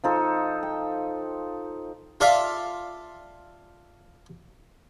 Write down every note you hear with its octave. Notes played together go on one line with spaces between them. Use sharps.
F3 D#4 A4
G5
F4 A4 D5 E5 F5